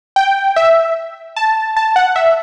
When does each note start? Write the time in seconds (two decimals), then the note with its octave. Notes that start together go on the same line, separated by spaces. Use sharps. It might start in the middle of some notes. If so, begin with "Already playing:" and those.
0.16 G5
0.56 E5
1.36 A5
1.77 A5
1.96 F#5
2.16 E5